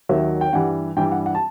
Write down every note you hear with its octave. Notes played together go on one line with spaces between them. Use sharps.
D#2 D#3 F#3 E5
G5
G2 E3 G3 F#5
G2 E3 G3 G5
F#5
F#5
A5